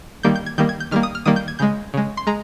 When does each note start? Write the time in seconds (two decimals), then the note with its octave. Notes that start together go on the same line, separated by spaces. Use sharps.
0.23 D#3 G3 A#3 G6
0.35 G6
0.46 G#6
0.58 D#3 G3 A#3 G6
0.69 G#6
0.80 G6
0.91 D#3 G3 A#3 F6
1.03 D#6
1.15 F6
1.25 D#3 G3 A#3 D#6
1.36 G6
1.48 G#6
1.59 C#3 G#3 G6
1.94 C#3 G#3
2.17 C6
2.27 G#3 A#5